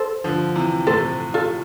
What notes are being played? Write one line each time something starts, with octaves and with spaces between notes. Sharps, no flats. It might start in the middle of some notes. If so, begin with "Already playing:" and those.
Already playing: A4 C5
D3 F3
C3 E3
A2 C3 A4 C5
F4 A4